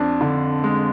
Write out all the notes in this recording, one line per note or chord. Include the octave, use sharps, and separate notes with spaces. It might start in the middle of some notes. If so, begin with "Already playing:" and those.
Already playing: F2 D4
D3
G#3